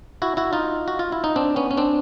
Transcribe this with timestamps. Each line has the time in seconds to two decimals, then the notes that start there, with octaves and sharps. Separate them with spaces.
0.22 E4 F#4
0.37 E4 F#4
0.53 D#4 F4
0.88 F#4
0.99 F4
1.12 E4
1.24 D#4
1.36 C4 D4
1.56 B3 C#4
1.71 C#4
1.77 C4 D4